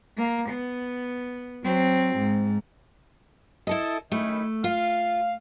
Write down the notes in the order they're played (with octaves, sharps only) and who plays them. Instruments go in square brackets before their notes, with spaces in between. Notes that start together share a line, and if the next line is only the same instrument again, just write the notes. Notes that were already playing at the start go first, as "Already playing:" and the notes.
[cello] A#3
B3
F#3 C4
G#2
[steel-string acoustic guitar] E4 A4 D#5
[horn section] F#2 D#3 E4 [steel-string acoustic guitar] A3
[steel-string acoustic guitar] F4 [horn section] F5